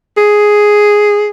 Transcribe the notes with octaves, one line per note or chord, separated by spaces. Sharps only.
G#4